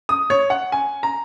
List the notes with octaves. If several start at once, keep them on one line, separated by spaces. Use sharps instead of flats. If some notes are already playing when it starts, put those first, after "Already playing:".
D#6
C#5
F#5
G#5
A#5